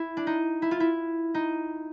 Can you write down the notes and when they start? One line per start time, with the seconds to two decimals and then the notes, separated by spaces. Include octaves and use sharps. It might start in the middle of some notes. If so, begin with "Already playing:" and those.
Already playing: E4
0.17 D4
0.27 D#4
0.62 E4
0.71 F4
0.80 E4
1.34 D#4